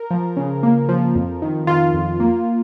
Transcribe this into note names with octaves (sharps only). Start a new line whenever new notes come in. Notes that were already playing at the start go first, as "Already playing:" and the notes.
Already playing: A#4
F3
C#3
A#3
F3
F2
D#3
D#3 F4
F2
A#3